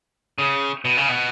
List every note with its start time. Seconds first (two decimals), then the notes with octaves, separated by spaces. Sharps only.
0.38 C#3
0.85 B2
0.97 C#3
1.09 B2